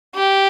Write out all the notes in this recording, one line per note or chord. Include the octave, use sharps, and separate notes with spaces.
G4